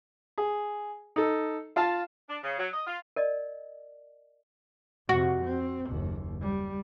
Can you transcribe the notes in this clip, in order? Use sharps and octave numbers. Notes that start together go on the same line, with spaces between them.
G#4
D#4 A4
F4 F5 A5
D4
C#3
F#3
D#5
F4
A#4 D5 D#5
F2 C3 F#4
C4
F#1 D#2
G3